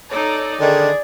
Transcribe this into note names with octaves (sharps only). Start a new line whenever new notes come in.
D#4 A4 C#5 D5
D3 D#3 G#4 D5